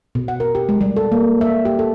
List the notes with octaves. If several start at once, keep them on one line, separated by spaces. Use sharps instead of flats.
B2
F#5
A#4
G4
G#3
G3
A4
A#3
E5
G4
A4